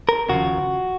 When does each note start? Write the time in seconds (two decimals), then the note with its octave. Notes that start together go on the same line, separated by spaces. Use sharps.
0.09 A#4
0.29 D#2 C#3 F3 F#4